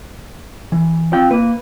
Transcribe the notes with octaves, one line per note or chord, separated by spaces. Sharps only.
E3
C4 F4 G5
A#3 B4